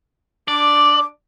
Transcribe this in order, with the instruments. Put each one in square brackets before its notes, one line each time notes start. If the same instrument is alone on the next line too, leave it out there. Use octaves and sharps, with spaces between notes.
[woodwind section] D4 D6 [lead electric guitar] D5